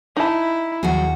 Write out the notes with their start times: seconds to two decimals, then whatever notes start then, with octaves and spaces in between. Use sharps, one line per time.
0.17 D#4 E4 A5
0.83 D#2 F3 F#3 F#4 G#4